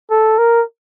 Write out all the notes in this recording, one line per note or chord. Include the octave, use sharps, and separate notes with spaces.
A4
A#4